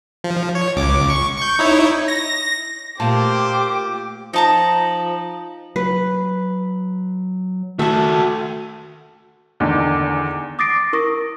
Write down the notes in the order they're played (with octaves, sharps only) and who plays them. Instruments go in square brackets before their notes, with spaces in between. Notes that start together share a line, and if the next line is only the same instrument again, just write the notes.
[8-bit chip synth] F3
C#5
C#2 D6
C#6
C#6 G6
D#4 E4 C#5
[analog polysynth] A#6
[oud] A#2 [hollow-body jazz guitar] A3 F5 A5 [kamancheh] G4 D6 [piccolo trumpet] C5
[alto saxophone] F3 [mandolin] D#4 A5 A#5
[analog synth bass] F#3 [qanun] B4
[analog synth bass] D#3 [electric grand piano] A3 [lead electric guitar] F#4 A4 [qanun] E5 A5
[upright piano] E2 D3 D#3
[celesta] D6 D#6 A6 A#6 C7 D7
E4 A#4 C#6 D#6 A#6